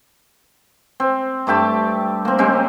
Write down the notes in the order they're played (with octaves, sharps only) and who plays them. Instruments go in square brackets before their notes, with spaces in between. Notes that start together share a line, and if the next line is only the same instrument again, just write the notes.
[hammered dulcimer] C4
G2 A3 G4 A5
A#3 C4
C#3 G#3 C4 G4